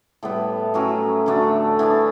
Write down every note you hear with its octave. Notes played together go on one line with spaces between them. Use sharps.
A2 G3 B3
A2 F#3 C#4 F#4
D3 A3 D4 F#4
E3 B3 D4